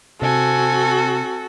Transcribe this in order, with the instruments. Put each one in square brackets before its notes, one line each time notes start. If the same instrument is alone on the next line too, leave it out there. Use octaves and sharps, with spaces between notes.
[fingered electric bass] C3 [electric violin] C4 G#5 [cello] F#4 [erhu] A4